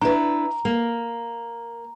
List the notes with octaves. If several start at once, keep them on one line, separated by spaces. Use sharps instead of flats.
D4 E4 B4 A#5
A#3